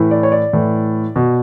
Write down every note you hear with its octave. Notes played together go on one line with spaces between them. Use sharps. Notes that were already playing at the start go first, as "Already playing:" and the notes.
Already playing: A2 E3
D5
C#5
D5
A2 E3
B2